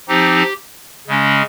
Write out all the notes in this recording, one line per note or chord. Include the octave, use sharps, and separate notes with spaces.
F3 C4 D#4 G4
C#3 G#3 C#4